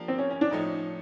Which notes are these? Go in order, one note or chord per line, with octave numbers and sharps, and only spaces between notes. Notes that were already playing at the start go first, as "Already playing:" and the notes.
Already playing: F3 A#3 D4 G4 A#4
C4
C#4
C#4
D4
A2 F3 A3 C#4 D#4